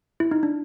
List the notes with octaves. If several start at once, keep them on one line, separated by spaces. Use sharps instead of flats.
E4
D#4
D4